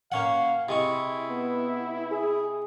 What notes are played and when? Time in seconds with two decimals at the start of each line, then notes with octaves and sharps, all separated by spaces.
0.12 A#3 C#4 F5 F#5
0.69 C3 G#3 E4 C#6
1.30 B3
2.11 G#4